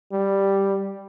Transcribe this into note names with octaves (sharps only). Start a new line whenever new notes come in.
G3